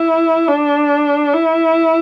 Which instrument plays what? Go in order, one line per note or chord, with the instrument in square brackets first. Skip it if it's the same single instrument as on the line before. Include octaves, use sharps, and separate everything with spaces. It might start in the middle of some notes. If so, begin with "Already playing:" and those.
Already playing: [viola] E4
D4
E4